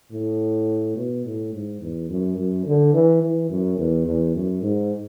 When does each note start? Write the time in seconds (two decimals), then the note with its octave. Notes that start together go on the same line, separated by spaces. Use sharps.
0.12 A2
0.96 B2
1.25 A2
1.53 G#2
1.81 E2
2.10 F#2
2.37 F#2
2.66 D3
2.93 E3
3.22 E3
3.50 F#2
3.78 E2
4.06 E2
4.35 F#2
4.62 G#2